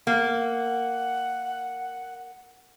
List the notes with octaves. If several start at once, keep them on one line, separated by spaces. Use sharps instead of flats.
A#3 F#5